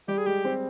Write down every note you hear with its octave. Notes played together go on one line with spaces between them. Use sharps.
G3 G4
G#4
G#3 G4
C4